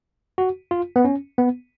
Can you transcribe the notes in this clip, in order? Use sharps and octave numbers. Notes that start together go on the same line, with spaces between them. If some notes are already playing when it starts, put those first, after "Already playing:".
F#4
F4
B3
C#4
B3